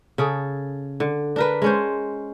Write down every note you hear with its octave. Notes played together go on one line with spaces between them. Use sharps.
C#3 G#4 A4
D3
D4 A#4 B4
G#3 C#4 C5